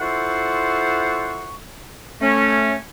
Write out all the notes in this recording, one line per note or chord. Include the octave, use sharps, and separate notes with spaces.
E4 F4 A4 C5 F#5 C#6
A3 C#4